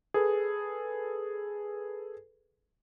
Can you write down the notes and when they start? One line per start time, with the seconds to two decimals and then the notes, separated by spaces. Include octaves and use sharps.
0.14 G#4 A4 B4